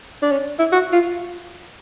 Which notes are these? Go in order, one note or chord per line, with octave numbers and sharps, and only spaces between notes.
D4
C#4
E4
F#4
F4